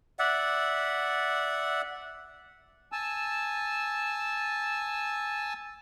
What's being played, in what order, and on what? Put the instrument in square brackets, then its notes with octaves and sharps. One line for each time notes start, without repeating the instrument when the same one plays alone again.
[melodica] D5 E5 F#5
[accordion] G#5 A5 E6